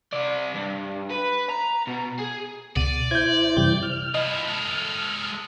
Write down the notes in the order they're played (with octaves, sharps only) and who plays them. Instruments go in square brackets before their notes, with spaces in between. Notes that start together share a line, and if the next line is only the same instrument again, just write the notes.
[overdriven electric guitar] C3 D5
G2
B4
A#5
B2
G#4
[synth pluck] C#2 B2 D#7 [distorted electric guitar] D5
[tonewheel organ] E4 C5 [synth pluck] G6 G#6
[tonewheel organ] F#2 E3 G6 [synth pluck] C3 G3
[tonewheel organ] F6
[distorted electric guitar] F3 E4 [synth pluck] D#5
[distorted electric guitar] G#3 A4